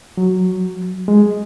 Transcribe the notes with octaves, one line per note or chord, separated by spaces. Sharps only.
F#3
G#3